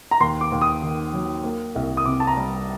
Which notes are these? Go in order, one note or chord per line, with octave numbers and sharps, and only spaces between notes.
A#5
D#2 C6
D6
D#2
D#6
D#3
F#3
A#3
C2
D#6
C3 D6
A5
A#5
G3